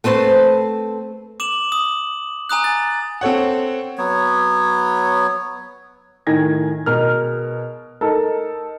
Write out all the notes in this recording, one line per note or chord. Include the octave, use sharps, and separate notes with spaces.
A3 C4 B4 C5 A5
D6 E7 F#7
D#6
G#5 A#5 D#6 F#6
A6
C4 A4 C#5 F#5
F#3 B3 C#5
A2 D#3 G#5 G#6 A#6
B2 G#4 A#4 F6
D#4 A4 A#4